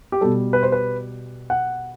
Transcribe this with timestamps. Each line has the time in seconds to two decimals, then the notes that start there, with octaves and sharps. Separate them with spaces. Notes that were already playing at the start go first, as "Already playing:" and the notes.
0.12 G4
0.21 B2 G3 A4
0.53 B4
0.63 C5
0.72 B4
1.50 F#5